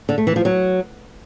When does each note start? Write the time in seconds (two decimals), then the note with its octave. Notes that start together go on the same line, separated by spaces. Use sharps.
0.09 D3
0.18 A3
0.27 E3
0.36 F3
0.45 F#3